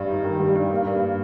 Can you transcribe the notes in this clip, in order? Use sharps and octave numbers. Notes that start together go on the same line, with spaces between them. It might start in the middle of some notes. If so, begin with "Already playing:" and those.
Already playing: G2 G3
D#4
D#3
G3
G2
A#3
G2